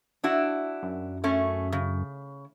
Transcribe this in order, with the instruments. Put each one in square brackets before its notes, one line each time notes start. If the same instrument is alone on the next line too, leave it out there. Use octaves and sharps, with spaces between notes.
[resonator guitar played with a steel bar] D4 E4 F#4
[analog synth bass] F#2
[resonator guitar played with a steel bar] A3 C#4
C#3